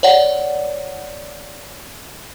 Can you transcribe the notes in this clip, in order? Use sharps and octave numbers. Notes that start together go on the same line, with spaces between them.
C#5 D5 F#5